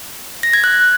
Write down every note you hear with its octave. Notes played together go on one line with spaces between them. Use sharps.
A#6
G#6
F#6